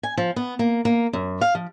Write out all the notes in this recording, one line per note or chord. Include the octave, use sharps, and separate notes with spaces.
G#5
F3
B3
A#3
A#3
F#2
F5
F3